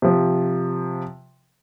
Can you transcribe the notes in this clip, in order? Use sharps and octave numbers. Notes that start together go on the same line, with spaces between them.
C3 F3